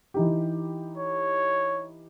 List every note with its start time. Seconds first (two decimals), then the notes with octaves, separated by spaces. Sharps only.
0.14 E3 D#4 G4
0.98 C#5